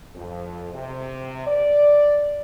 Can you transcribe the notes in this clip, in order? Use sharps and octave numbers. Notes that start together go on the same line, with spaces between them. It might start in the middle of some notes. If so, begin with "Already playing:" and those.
F2
C3
D5